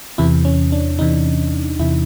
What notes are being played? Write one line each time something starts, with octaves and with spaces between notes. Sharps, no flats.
E2 C3 E3 E4
C#4
D4
E2 C3 E3 D#4
E2 C3 E3 E4